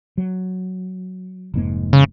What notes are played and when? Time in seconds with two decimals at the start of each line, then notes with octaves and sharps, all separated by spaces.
0.18 F#3
1.54 F1 G#2 A#3
1.93 C#3